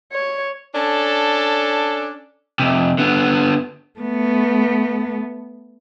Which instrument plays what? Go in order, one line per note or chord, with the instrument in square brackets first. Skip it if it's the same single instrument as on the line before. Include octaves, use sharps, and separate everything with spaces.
[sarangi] C#5
[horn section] C#4 D4 A4
[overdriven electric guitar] F2 C3
D3 B3
[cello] A3 B3